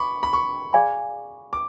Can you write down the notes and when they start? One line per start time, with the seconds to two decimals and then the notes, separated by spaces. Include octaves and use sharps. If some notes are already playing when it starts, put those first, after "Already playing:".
Already playing: B5 C#6 D6
0.23 B5
0.33 C#6
0.73 G#4 D5 F5 G#5 B5
1.53 D6